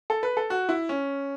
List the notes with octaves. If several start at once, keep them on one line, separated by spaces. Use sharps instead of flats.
A4
B4
A4
F#4
E4
C#4